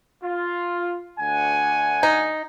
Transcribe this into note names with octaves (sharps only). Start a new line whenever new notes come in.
F4
D2 F#5 G#5
D#4